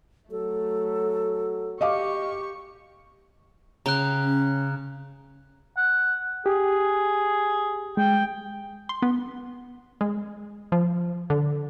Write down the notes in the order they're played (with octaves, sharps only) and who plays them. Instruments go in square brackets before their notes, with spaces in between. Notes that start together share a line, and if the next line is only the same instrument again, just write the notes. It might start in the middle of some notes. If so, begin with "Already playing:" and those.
[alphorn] F#3 [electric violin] A3 [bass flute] A4
[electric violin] G4 C#6 [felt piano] D#5 F5 D6
[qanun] C#3 G5 [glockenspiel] A#5 F#6
[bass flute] C#4
[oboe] F#5
[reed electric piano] G4 [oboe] G#4
[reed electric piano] G#3 [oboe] G5
[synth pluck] C6
B3
G#3
F3
D3